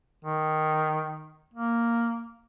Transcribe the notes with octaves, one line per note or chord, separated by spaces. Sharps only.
D#3
A#3